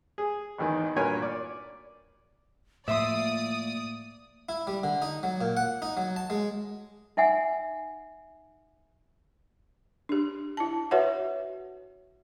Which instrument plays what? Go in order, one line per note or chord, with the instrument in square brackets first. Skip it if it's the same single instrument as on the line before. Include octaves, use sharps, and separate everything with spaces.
[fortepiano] G#4
G#1 E2 D#3
G2 A#2 F#4 A#4 C#5 G#5
D5
[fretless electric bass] A2 F3 [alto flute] A#3 [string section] D5 D#6 [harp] E5 C6
[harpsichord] E4
G3
D3
D#4
F#3
A#2
F#5
D#4
F#3
A5
G#3
[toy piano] D#4 E5 F#5 G#5
[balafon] D4 G4
E4 A5
F#4 B4 C#5 E5 F#5